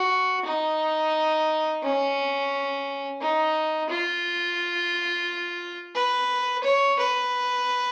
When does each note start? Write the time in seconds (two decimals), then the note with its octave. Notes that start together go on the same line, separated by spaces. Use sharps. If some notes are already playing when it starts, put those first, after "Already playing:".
Already playing: F#4
0.45 D#4
1.83 C#4
3.21 D#4
3.89 F4
5.95 B4
6.64 C#5
6.99 B4